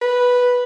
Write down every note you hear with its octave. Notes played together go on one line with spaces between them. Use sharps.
B4